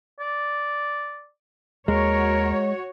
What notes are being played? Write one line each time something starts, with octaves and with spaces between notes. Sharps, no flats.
D5
D#2 G#3 F#4 A#4 C#5